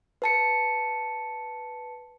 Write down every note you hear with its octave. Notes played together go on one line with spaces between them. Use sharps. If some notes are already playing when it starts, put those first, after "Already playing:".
B4 A5 C#7